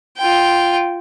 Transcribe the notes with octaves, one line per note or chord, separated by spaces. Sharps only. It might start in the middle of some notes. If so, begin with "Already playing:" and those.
F4 G5